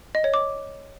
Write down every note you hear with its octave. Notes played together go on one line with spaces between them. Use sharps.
D#5
C#5
D6